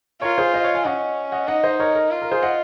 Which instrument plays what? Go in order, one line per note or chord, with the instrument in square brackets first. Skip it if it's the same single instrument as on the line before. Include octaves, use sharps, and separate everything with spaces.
[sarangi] F4 [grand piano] A#4 C#5
[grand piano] G#4 C5
C5 D#5
C#5 F5
F5 G#5
[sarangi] C#4 [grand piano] D#5 F#5
[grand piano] D#5 F#5
[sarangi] D#4 [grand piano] D#5 F#5
[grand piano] C5 D#5
A#4 C#5
A#4
[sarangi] F4
[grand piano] A#4
G#4 C5
D#5 F#5